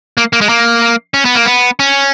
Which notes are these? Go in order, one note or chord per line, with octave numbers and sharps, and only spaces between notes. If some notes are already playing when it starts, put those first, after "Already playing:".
A#3
A#3
G#3
A#3
C#4
B3
A#3
B3
C#4